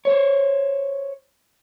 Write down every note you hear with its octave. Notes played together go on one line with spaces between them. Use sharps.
C5 C#5